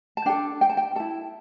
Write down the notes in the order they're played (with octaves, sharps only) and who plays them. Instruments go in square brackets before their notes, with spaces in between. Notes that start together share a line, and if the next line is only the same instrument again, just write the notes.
[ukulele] A5
D4 A4 G5
G5
A5
G5
E4 A4 A5